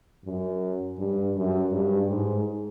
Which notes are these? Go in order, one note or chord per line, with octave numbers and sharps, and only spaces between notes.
F#2
G2
F#2
G2
G#2